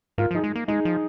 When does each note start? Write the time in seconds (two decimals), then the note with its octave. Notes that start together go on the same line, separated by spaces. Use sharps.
0.18 G#2 F4 A#4
0.31 F3
0.35 D#4 G#4
0.44 G#3
0.55 A#3
0.68 G#3 D#4 G#4
0.85 F3